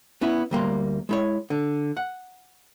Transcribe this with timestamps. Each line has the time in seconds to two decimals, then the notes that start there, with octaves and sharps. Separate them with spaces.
0.21 B3 C#4 E4
0.51 D2 G3 A#3 C6
1.09 G#3 E4 C#5
1.50 D3
1.97 F#5